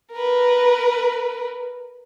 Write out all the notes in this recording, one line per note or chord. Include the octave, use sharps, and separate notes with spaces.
A#4 B4